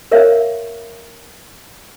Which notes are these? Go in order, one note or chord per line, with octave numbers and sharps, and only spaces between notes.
A#4 C#5 E5 F5